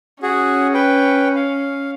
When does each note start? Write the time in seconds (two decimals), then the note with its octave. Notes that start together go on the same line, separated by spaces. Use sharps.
0.23 C#4 F#4 G#4
0.74 B4 G5
1.35 F5